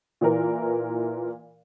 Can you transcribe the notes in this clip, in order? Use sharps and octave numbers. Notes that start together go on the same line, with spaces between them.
A#2 E3 A#4